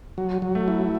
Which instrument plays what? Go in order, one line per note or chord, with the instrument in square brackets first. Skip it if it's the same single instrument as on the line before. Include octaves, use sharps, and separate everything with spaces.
[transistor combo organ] F#3
F#3
[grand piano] A3
[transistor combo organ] E4